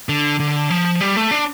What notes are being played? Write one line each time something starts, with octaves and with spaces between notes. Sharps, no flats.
D3
D3
F3
G3
A3
D4